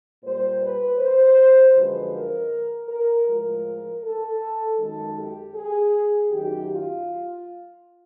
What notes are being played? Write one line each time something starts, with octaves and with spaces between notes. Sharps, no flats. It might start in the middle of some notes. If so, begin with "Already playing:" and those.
A#2 G3 C5
B4
C5
F#2 D3 F3 G#3 B4
A#4
A#4
A2 F3 G#3 A#4
A4
F#2 D#3 G#3 A4
G4
G#4
F#2 D#3 F#3 G4
F4